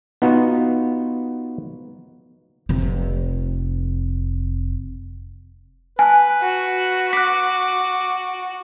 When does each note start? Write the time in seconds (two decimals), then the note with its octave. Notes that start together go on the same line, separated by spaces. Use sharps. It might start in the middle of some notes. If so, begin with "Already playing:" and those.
0.22 B3 D#4 F4 F#4
2.69 F1 C3
5.99 B4 G#5 A5 F#6
6.42 F#4
7.13 D6 F#6 B6